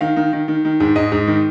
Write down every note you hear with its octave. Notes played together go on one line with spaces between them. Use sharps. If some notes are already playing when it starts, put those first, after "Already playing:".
D#3 F5
D#3
D#3
D#3
D#3
G#2
G#2 D#5
G#2
D#3